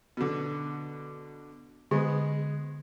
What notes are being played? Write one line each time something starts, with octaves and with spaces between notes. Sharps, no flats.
B2 D3
D3 G#3 B3